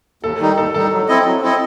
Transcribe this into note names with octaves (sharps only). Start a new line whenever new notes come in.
D#2 A4
D#3 G3 D#4
D#2 A4
D#3 G3 D#4 A4
F#3
C4 E4 A4 D#5
F#3
C4 E4 A4 D#5